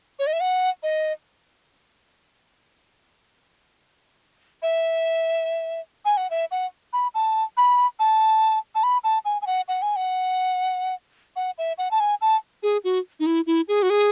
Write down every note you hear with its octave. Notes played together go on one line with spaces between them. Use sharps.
C#5
D#5
E5
F#5
D#5
E5
G#5
F#5
E5
F#5
B5
A5
B5
A5
A5
B5
A5
G#5
G#5
F#5
F#5
G#5
F#5
F#5
E5
F#5
A5
G#5
A5
G#4
F#4
D#4
E4
E4
G#4
F#4
G#4